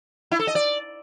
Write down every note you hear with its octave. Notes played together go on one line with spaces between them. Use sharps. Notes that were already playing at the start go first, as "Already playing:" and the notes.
E4
A4
D#5
D5